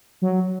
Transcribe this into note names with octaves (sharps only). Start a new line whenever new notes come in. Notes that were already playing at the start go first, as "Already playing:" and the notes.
F#3